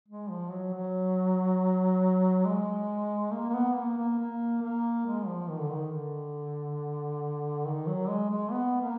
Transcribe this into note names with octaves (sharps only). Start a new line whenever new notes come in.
G#3
F3
F#3
F#3
G#3
A#3
A#3
B3
A#3
A#3
A#3
A#3
G#3
F3
D#3
D3
D#3
D3
D#3
F#3
G#3
G#3
B3
A#3